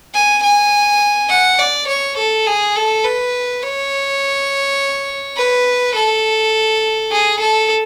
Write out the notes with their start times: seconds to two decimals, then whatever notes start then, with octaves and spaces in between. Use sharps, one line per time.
0.14 G#5
0.43 G#5
1.29 F#5
1.59 D5
1.88 C#5
2.18 A4
2.46 G#4
2.76 A4
3.04 B4
3.63 C#5
5.37 B4
5.95 A4
7.11 G#4
7.40 A4